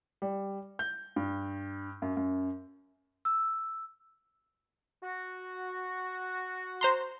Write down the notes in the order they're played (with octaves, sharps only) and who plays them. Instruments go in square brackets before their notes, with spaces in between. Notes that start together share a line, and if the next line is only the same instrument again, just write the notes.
[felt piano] G3
G6
G2
F#2
F#2
[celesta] E6
[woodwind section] F#4
[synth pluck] C5 A#5 C6